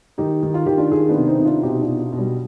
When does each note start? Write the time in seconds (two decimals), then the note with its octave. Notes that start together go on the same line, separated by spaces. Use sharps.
0.18 D#3 D#4 G4
0.43 D#3
0.54 F4
0.66 D#3 G4
0.78 D4 F4
0.91 D#3 F4 G#4
1.09 B3 D4
1.16 C3
1.27 C4 D#4
1.39 C3
1.45 D4 F4
1.63 B2 D#4 G4
1.81 D4 F4
1.88 B2
2.13 B2
2.18 G3